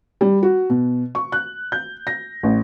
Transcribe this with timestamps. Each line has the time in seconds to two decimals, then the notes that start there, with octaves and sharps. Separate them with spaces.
0.21 G3
0.43 F#4
0.70 B2
1.15 C#6
1.32 F#6
1.72 G6
2.07 A#6
2.43 A1